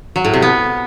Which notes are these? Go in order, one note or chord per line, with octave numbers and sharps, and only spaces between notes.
F#3
A2
C3
B3